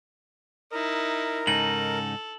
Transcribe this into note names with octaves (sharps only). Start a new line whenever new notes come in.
D#4 E4 A#4
G#2 C#3 D#4 A4 F#7